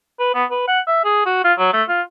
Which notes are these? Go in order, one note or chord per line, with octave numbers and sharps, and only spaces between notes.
B4
B3
B4
F#5
E5
G#4
F#4
F4
F#3
A3
F4